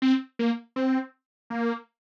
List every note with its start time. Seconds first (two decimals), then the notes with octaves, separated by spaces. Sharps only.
0.02 C4
0.39 A#3
0.76 C4
1.50 A#3